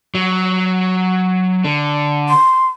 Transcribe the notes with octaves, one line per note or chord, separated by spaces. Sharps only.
F#3
D3
C6